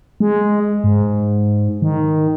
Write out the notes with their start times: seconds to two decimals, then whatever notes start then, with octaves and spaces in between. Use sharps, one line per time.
0.20 G#3
0.84 G#2
1.82 D#3